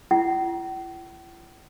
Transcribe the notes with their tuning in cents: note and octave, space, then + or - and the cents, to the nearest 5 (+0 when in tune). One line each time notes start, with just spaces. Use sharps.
E4 +45 G5 -45